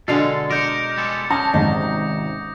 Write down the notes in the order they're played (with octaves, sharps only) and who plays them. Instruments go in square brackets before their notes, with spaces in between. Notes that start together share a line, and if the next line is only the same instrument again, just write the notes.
[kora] B2 D3 G#3 [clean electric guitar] A4 F5
[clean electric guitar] A#4 [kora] D#5 [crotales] D6 G6 C#7
[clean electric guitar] G3 G#3 A4
[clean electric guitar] D3 [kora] C#4 [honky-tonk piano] A5 [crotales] D#6 A#6
[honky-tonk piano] G#1 G#2 [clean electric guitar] C3 [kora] D#4